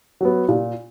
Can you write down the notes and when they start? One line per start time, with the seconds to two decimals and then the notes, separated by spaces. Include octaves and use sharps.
0.21 F#3 B3
0.49 A#2